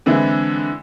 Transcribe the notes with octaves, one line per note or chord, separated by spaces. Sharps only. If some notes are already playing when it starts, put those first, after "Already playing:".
D3 E3 G#3 C4 D4 E4